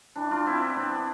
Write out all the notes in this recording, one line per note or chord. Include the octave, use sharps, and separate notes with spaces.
E3 D4
E3 D4 F4
B3 C4 E4
B3 D4
B3 C4
E3